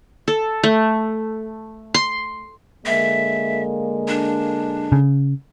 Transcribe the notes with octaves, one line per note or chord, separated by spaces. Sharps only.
A4
A3
C6
D3 G#3 A#3 E5
D4
C#3